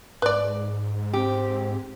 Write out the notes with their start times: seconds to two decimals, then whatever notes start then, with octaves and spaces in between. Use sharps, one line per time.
0.22 G#2 B4 D5
1.13 C4 G4